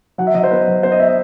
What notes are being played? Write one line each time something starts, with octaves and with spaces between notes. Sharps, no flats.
F#3 F#5
E5
F#3 D#5
C5
B3 B4
F#3
B3 C5
D#5
B3 E5
D#5